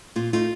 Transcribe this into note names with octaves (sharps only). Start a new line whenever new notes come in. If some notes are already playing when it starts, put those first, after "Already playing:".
A#2 F4
A3 D#4 F4